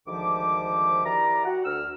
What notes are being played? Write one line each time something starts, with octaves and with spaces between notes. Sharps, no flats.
D2 G#2 D#3 F3 G4 D6
E4 G4 A#4 D5 A#5
F#4 F#5
D2 E6 F6